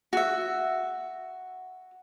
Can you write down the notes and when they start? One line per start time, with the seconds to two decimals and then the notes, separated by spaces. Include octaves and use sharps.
0.13 F#4 E5